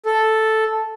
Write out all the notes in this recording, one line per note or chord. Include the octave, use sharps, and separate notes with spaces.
A4